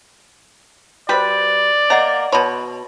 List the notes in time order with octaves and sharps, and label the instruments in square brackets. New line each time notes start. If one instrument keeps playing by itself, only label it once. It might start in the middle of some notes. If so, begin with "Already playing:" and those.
[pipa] G3 B4 B5 [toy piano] F#4 C5 [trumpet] D5
[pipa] A#3 A#5 [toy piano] C#5 D#5 F#5
[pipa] B2 C#5 [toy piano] A5 B5 C6